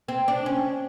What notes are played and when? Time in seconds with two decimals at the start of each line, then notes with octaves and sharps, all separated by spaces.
0.08 C4
0.28 D4
0.46 C#4